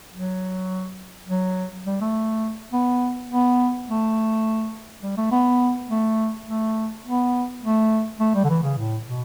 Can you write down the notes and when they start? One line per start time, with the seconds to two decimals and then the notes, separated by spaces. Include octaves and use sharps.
0.13 F#3
1.29 F#3
1.86 G3
2.01 A3
2.73 B3
3.30 B3
3.88 A3
5.03 G3
5.17 A3
5.32 B3
5.89 A3
6.47 A3
7.05 B3
7.63 A3
8.20 A3
8.34 G3
8.44 D3
8.50 E3
8.63 C#3
8.78 A2
9.07 B2